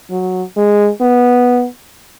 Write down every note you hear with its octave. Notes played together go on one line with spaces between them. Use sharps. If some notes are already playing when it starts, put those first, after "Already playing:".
F#3
G#3
B3